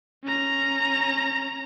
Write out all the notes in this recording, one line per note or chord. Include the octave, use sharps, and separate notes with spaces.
C#4 A#5